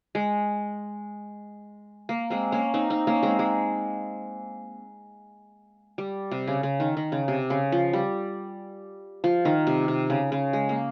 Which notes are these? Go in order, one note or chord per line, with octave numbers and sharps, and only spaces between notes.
G#3
A#3
G#3 C4
A#3 C#4
C4 D#4
C4 D#4
A#3 C#4
G#3 C4
G#3
G3
C3
C#3
C#3
D#3
D#3
C#3
C3
C#3
F3
G3
F3
D#3
C3
C3
C#3
C#3
G#3
A#3